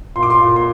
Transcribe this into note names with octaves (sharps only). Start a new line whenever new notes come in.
A#2 C6
D6
C6
A#2
C6